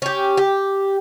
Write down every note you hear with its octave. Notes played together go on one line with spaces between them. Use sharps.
C#4 G4
G4